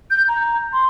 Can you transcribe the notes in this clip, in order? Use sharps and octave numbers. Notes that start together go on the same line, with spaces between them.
G6
A#5
C6